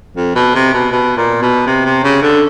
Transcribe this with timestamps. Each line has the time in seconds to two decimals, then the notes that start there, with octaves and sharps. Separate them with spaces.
0.16 F2
0.35 B2
0.55 C3
0.74 B2
0.92 B2
1.17 A#2
1.42 B2
1.67 C3
1.85 C3
2.04 C#3
2.23 D3